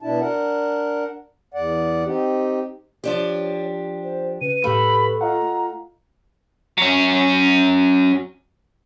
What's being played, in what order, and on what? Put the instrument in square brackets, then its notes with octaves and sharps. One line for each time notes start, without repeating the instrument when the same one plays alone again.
[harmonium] B2 D4 E4 A5
D4 A#4 F#5
E2 D5 F#5
C4 D#4 G4
[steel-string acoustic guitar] F3 D4 G4 [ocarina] C#5
[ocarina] C5
[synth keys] C#3 [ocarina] B4 [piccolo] D#7
[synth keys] A2 G4 F5 [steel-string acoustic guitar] A3 [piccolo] B5
[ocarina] F4 [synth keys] D#5 F5 F#5 [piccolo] A#5
[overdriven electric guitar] F#3 C#4